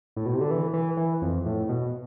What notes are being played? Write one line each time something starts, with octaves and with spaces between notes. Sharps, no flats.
A2
B2
C3
D3
E3
E3
E3
F2
A2
B2